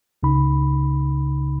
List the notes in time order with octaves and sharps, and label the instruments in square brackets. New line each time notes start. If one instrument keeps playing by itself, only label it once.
[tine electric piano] C#2 C#3 D#4 B5